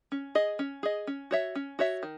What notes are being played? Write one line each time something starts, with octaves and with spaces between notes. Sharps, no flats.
C#4
G#4 D#5
C#4
G#4 D#5
C#4
F#4 C#5 E5
C#4
F#4 C#5 E5
D#3